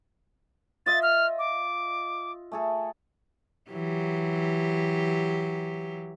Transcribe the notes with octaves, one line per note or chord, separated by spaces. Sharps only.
F4 D#5 E5 A6
F6
D6
A3 G#4 A4
E3 F#3 G4